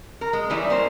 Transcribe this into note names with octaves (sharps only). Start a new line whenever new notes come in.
A#4
G#3
E3 G3 C#4 E4
A#3 C5